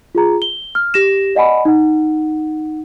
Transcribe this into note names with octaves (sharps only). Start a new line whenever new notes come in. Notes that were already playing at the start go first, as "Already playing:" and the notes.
F4 G#4 A#5
G7
F6
G4 A#6 E7
D5 D#5 F#5 G#5 B5
D#4 F#5